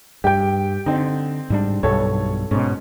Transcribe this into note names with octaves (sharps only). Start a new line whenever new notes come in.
G2 G4 G5
D3 C4 D#4
G#2 G3 D4
B1 G2 A4 C#5
G#2 B2 C#4